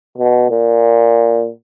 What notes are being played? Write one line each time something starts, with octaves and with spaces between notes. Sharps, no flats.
B2
A#2